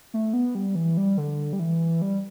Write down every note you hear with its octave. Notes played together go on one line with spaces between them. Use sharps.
A3
B3
G3
E3
G3
D3
G3
E3
G3